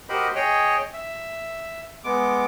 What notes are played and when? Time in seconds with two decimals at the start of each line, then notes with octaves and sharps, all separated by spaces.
0.09 F#4 G4 A#4 C5 D#5 B5
0.35 G#4 C#5 D#5 G5
0.94 E5
2.04 G#3 B3 D6